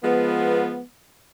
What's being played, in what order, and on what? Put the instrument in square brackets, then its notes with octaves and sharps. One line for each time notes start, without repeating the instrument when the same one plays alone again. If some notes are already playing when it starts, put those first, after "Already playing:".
[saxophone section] F3 G#3 B3